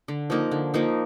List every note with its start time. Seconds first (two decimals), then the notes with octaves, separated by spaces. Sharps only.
0.08 D3
0.30 F3 A#3 D#4
0.51 D3
0.74 F3 A#3 D#4